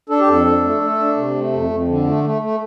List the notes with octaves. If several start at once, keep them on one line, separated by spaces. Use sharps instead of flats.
D4 A4
G4
F2 A4
D4
A3
A3
D4
C3
A3
F2
F2
D3
A3
A3
A3